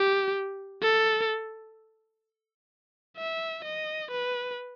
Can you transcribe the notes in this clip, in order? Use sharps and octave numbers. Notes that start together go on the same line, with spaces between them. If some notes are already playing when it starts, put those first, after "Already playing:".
Already playing: G4
A4
E5
D#5
B4